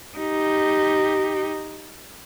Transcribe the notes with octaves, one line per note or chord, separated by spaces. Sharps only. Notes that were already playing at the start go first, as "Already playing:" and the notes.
D#4 G4